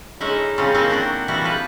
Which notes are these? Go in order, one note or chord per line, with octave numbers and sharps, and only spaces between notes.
D3 G#3 C#4 D#4 E4
C#3 F3 G3 C4 C#4
F#3 A#3 C4 D#4 E4 A4
C4 D4 F#4 F#5
E3 G3 E4 F#4
F3 B4